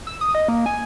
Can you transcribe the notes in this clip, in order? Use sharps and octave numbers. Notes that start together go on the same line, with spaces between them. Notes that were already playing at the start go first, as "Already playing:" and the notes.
E6
D#6
D#5
A#3
G#5